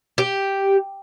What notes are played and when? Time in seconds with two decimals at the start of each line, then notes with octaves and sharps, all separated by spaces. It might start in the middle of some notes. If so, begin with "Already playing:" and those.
0.18 G4